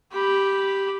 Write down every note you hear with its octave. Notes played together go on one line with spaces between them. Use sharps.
G4 B5